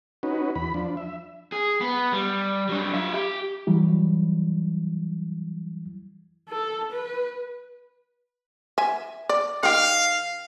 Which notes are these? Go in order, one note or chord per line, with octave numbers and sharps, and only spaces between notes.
C#4 D#4 F#4 B4
E2 B5
F3 D4
E5
G#4
B3
G3
F#3 D4
F4 E5
G4
E3 F#3 G3 E4
A4
B4
E5 G#5
D5
D#3 G4 F5